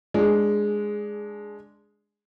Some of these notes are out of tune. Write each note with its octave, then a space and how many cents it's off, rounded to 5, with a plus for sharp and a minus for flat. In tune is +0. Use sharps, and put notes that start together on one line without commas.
G#3 +0 D4 -5 G#4 +15